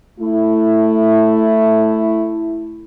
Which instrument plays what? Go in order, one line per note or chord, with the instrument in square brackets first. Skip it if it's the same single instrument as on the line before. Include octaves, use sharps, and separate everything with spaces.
[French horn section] A3 E4